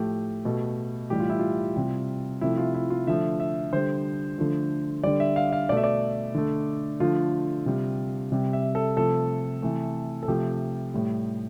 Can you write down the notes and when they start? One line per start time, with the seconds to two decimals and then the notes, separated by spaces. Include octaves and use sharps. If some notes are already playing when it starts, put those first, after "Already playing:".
Already playing: A2 F3 A3 G4
0.45 B2 A3
1.10 A2 E3 G3 G4
1.20 F4
1.30 E4
1.39 F4
1.76 C3 G3
2.41 C3 F3 A3 E4
2.58 F4
2.74 E4
2.90 F4
3.07 D3 F3 A3 E5
3.40 E5
3.73 D3 G3 C5
4.38 D3 F3 A3
5.04 D3 G3 D5
5.20 E5
5.36 F5
5.53 F5
5.69 B2 A3 D5
5.77 E5
5.84 D5
6.35 D3 A3
7.00 D3 F3 A3 F4
7.66 C3 G3
8.32 C3 G3
8.53 E5
8.75 A4
8.97 C3 F3 A3 A4
9.62 C3 E3 A3
10.23 A4
10.28 C3 F3 A3 G4
10.94 A2 G3